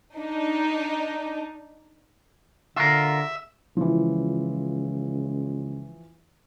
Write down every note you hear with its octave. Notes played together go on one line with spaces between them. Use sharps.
D4 D#4
D3 F4 A#4 E5
C#2 E3 F3